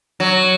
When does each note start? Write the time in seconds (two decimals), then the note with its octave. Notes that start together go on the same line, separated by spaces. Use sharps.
0.20 F#3